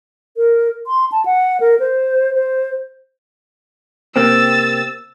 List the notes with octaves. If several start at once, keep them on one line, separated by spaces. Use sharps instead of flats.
A#4
C6
A5
F#5
A#4
C5
C5
C3 A#3 C4 E6 A6